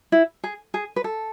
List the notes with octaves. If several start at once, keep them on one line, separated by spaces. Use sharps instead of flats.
E4
G#4
G#4
B4
A4